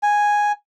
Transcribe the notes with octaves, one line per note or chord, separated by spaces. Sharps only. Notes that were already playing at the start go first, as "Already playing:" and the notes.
G#5